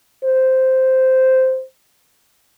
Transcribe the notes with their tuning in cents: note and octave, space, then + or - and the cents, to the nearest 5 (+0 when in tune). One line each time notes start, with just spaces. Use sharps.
C5 -5